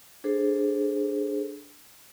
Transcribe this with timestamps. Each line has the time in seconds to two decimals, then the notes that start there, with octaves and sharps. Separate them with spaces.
0.24 D4 G#4 A4 C5